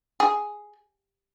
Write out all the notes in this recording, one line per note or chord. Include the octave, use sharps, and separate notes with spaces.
G#4